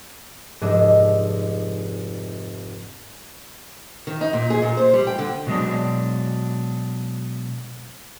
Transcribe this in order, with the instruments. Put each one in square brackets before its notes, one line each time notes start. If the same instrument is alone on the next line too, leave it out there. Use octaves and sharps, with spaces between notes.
[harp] F1 G#2 G#3 D4 D#5 E6
[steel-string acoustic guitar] D#3
D#4
A#2
G#4
A#2
C5
G3
G5
D3
[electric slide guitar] B2 F#3 G#3 D4